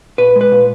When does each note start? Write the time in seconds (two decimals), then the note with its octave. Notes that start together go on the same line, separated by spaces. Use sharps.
0.18 A#2 B4
0.36 G#3
0.41 B4
0.52 A#2